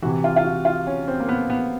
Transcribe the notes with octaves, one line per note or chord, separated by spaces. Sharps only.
C3 E3 F#4
F4
F4
F#4
F4
C#4
C4
A#3
B3
B3